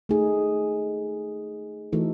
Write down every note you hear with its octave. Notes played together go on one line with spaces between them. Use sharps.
A3 D#4 G#4
E3 A3 D#4 F#4 A4